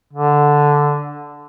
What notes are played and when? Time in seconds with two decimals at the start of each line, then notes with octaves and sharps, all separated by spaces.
0.13 D3